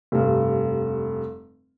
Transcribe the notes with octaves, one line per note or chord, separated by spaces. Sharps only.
F1 G2